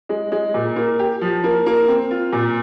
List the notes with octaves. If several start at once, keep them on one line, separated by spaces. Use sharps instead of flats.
G#3
G#3
A#2
A#3
G4
F3
A#3
A#3
C4
F4
A#2